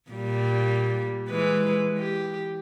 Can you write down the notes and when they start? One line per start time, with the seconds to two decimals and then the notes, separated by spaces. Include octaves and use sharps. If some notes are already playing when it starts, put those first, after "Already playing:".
0.10 A#2 G3
1.29 E3 G#3 B4
1.98 G4